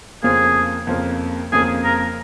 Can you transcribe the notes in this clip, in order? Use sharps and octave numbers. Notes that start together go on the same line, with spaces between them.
F2 C#3 F3 A#3 G#4
F2 C#3 F3 A#3
F2 C#3 F3 A#3 G#4
A#4